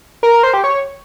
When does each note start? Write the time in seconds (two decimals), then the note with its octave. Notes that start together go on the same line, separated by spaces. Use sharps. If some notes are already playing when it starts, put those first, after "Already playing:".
0.23 A#4
0.33 A#4
0.43 C5
0.54 G4
0.64 C#5